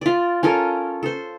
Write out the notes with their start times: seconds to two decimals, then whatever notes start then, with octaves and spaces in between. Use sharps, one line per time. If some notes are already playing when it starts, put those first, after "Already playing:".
0.01 F4 D5
0.43 C#4 F4 A4 A#4
1.03 A4 C5